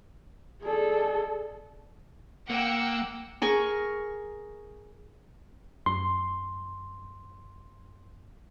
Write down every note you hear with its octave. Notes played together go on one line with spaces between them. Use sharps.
G#4 A4 D5 D#5 A#5
D4 D#5
A#3 F#5 G5 E6
G#4 A#4 C#6
F#2 C6